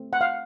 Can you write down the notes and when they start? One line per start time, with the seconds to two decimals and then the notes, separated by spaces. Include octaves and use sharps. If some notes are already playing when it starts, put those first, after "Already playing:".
Already playing: A3 C4
0.13 F#5
0.21 F5